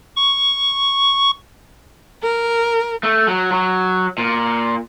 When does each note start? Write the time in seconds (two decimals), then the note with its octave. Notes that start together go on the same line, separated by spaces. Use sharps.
0.16 C#6
2.23 A#4
3.03 A3
3.28 F#3
3.52 F#3
4.18 A#2